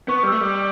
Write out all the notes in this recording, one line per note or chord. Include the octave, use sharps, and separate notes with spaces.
B3 C#6
C#6
G3
E6
A3
G3 E6